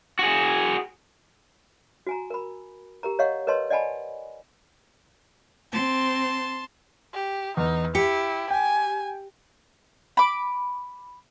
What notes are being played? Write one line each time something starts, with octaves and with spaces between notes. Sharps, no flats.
F#4 G#4
F#4 G#5 A#5
A#4 B5
G4 A#4 A#5
C#5 D#5 F5 F#5 C#6
A#4 B4 C#5 D#5 A5 C6
D5 D#5 F#5 G#5 A5 B5
C4 A5 C6
G4
E2 D#4
E4 G4 C#7
G5 G#5
B5 D6